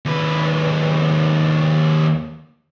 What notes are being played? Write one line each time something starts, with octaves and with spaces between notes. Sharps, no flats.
D#2 B4